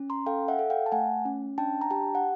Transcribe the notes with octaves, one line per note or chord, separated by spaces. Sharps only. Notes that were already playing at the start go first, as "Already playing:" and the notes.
Already playing: C#4
A#5 C6
A4 F5 G5
E5 F#5
A4
F5 G5
A5
A3 F#5 G#5
C#4
D4 G5 A5
A#5
G4 G5 A5
F#5